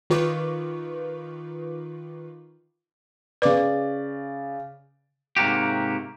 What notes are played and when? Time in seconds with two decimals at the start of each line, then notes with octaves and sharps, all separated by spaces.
0.10 D#3 F4 B4 C#6 D6
3.42 C#3 B4 D5 D6
5.37 G#2 C3 A#3 F#4 G4